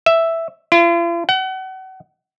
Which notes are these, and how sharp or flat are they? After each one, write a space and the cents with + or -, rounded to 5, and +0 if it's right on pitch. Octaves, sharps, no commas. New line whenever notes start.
E5 +0
F4 -45
F#5 +35